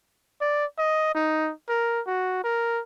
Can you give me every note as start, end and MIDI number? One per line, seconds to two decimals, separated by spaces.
0.41 0.65 74
0.78 1.11 75
1.15 1.51 63
1.69 2.01 70
2.07 2.41 66
2.44 2.81 70